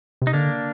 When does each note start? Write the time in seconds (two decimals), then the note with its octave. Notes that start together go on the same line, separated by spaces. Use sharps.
0.22 C3
0.27 D#4
0.33 D3 A#3 D4